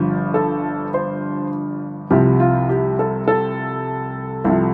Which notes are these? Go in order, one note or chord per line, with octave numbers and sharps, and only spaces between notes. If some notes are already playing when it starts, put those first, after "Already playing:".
Already playing: G1 G2 F3
A4
C5
C2 C3 F3 G4
F4
G4
A4
A4
C2 C3 F3